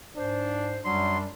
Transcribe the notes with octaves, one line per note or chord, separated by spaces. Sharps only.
G#2 D4 C5
F#2 F#3 G3 D4 C6